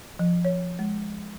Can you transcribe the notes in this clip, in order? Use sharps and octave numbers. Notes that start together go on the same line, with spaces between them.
F3
C#5
G#3